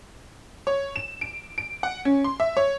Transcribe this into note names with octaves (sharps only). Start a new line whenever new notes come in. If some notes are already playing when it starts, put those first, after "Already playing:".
C#5
E7
D7
D7
F#5
C#4
C6
E5
C#5